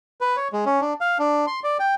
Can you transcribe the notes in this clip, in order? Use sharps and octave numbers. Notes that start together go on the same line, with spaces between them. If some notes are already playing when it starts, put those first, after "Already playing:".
B4
C#5
G#3
C#4
D4
F5
D4
C6
D5
G5